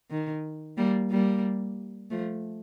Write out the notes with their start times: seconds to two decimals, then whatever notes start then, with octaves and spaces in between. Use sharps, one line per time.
0.10 D#3
0.77 G3 A#3
1.10 G3 A#3
2.11 F3 A3